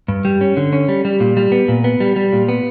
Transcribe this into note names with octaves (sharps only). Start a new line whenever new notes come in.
G2
G3
C#4
D3
C#4
G3
G3
A#2
G3
B3
A#2
B3
G3
G3
A#2
B3